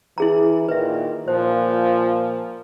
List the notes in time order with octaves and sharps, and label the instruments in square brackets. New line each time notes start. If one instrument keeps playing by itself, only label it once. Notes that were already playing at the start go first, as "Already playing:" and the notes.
[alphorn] E3 [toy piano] E4 G#4 A#5
[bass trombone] A#2 [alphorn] D#3 [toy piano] B4 E5
[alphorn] A#2 [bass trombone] F3 [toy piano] C5